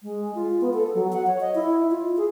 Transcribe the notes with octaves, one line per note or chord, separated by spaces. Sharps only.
G#3
F4
B3
A4
F#3
F#5
C#5
D#5
E4
F4
G#4